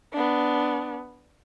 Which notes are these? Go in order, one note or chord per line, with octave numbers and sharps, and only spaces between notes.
B3 D4